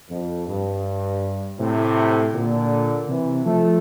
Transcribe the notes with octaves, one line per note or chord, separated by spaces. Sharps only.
F2
G2
A2 C3
A#2 D3
C3 E3
F3 A3